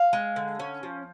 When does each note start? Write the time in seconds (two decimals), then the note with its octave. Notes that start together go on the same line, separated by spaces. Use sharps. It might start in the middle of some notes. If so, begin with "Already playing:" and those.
Already playing: F5
0.13 G#3
0.36 D3
0.60 C#4
0.83 F3